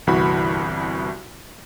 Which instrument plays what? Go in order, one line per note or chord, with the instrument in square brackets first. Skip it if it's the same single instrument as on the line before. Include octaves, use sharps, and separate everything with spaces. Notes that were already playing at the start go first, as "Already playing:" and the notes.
[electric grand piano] G1 C2 E3 F#4 B5